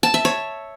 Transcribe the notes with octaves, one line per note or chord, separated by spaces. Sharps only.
A5
E5
C#5